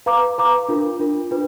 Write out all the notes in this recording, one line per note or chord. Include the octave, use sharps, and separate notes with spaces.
B4 F5 A#5 D6
B4 F5 A#5 D6
D4 F4 A#4
D4 F4 A#4
D4 F4 B4